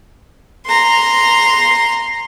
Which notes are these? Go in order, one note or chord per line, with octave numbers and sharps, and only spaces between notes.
A#5 C6